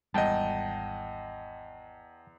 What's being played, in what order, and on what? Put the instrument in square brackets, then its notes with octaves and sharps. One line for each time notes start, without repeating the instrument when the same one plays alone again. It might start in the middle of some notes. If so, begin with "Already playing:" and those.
[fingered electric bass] G#1 G3 G#3 [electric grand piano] E2 D#5 [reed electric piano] F#5 G5 A5